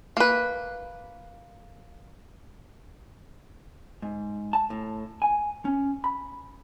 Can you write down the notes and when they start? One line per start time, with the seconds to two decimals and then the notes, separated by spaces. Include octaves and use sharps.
0.17 A#3 B4
4.02 G#2
4.53 A5
4.70 A2
5.22 G#5
5.65 C#4
6.04 B5